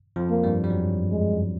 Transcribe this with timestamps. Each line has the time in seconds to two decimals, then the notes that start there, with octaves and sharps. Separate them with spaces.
0.16 F2 F3
0.30 A#3
0.44 G2 G3
0.64 G3
0.70 F#2 F#3
1.11 G#3